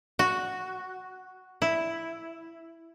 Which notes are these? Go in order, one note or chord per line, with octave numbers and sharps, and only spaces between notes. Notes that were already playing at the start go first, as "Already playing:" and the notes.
F#4
E4